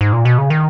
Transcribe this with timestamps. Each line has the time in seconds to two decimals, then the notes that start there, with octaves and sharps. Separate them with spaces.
0.01 G#2
0.13 A#2
0.25 B2
0.38 C#3
0.50 D#3